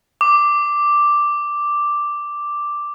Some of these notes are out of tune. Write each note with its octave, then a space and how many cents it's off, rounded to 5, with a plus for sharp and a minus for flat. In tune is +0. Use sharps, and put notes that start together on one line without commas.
D6 +0